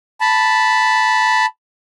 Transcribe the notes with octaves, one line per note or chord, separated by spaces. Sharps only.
A5 B5